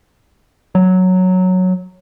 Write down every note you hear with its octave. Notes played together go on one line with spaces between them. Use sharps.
F#3